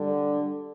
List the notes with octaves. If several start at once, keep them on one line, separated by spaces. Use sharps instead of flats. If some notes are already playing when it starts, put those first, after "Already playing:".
Already playing: D3 G3